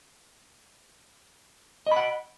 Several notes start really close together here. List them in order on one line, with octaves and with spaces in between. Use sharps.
D#5 B5 F#5